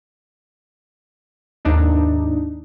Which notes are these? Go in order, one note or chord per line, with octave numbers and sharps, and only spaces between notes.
D#2 G#2 D4 D#4